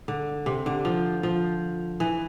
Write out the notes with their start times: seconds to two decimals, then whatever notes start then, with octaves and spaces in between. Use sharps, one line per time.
0.08 D3
0.46 C3
0.66 D3
0.85 F3
1.23 F3
2.00 E3